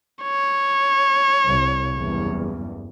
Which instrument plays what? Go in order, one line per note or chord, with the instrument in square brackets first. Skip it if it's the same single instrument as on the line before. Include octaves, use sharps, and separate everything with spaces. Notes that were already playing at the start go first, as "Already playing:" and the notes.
[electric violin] C#5
[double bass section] C2
F#1 E2 G2